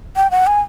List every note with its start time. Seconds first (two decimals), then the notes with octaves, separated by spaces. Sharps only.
0.16 G5
0.31 F#5
0.47 G#5